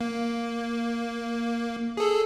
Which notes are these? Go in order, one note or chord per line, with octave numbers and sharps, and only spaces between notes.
A#3
G#4 A4